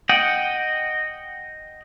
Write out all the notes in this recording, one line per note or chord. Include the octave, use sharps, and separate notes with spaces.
D#5 F#5 G5